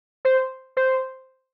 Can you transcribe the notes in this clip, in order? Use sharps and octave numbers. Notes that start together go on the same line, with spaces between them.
C5
C5